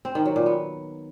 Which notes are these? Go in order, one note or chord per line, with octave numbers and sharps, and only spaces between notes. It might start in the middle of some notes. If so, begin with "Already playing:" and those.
C4
D#3
F#3
A#2
B3